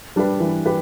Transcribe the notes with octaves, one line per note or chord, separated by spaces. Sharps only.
G3 D4 G4 B4
E3
G4 B4